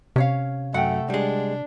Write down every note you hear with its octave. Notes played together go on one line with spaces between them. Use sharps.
C3 C#4 C#5 F5
F#2 A3 F#5 G5
G3 G#3 D4